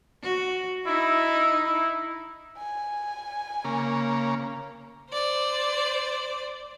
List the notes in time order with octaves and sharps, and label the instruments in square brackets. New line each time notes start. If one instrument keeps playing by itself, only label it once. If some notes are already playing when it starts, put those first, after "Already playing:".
[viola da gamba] F#4
[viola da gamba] D#4 [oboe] E4
[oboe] E4
[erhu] G#5
[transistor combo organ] C#3 A#3
[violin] C5 D5